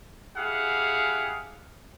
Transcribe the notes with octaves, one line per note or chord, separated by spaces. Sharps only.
E4 G4 G#4 F5 F#5